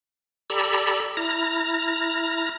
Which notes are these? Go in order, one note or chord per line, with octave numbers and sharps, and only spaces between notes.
G4 A4 D5 A#5 B5 E6
E4 A#5 F6 A#6